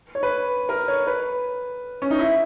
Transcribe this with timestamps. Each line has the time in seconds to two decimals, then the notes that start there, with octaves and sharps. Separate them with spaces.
0.15 C#5
0.23 B4
0.69 A#4
0.88 C#5
1.07 B4
2.02 C#4
2.11 D#4
2.19 E4